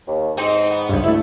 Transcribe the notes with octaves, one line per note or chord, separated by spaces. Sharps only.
D#2
G#2 C4 D#4
B3
C#2 G2
D2 A3 E4